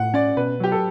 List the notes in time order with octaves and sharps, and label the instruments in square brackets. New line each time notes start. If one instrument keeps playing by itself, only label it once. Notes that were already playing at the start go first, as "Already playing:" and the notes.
Already playing: [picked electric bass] A2 [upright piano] F#5
[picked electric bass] C#4 [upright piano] D5
[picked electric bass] B2 [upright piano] B4
[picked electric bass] F#3 [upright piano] G4
[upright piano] A4